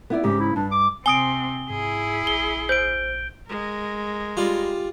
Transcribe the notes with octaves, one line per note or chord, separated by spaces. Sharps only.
B3 E4 D5
G#2 C#3 G4
E4
G2 D4
D6
C3 C4 G#5 D#6 D7 G7
G#2 E4 G#4
A#1 G7
C5 G6 D7
G#3 A#4
G3 F4